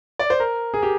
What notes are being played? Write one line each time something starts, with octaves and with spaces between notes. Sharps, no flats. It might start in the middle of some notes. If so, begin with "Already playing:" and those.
D5
C5
A#4
G#4
G4